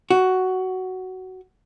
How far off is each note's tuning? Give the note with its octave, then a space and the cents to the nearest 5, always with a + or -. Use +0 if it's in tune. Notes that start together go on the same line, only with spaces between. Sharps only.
F#4 +10